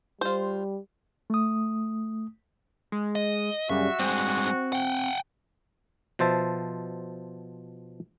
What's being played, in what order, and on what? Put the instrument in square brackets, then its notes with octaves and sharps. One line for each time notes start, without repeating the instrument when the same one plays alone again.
[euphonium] G3 [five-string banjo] F4 C5
[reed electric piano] A3 D#6
[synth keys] G#3
[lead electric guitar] D#5
[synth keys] F#2 C#3 G3 [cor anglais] F#4 [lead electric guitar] E5
[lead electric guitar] G2 G#3 [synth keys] C4
[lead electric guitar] F#5 G5
[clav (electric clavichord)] B2 F3 C5 E5 A5